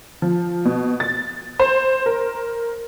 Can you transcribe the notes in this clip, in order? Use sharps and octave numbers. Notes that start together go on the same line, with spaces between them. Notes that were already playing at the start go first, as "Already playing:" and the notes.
F3
B2
A6
C5
A#4